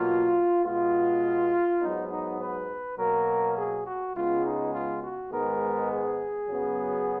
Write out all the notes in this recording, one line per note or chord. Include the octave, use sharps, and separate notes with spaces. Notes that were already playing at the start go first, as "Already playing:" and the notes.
Already playing: B2 F#3 A#3 F4
B2 G#3 B3 F4
G#2 F#3 B3 D#4
D#4
B4
B2 F#3 A#3 A#4
G#4
F#4
C#2 C#3 G#3 B3 F4
D#4
F4
F#4
G#2 D#3 G#3 B3 A#4
G#4
F#2 C#3 F#3 B3